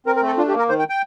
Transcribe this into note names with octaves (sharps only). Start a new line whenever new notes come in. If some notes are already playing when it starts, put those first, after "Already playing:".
C4 A#4
A#4
A3 A4
D4 F4
G4
A#3
A#4
D#3 C5
G5
G5